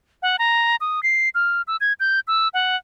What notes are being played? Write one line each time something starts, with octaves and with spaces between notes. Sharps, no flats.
F#5
A#5
D#6
C7
F6
E6
G#6
G6
E6
F#5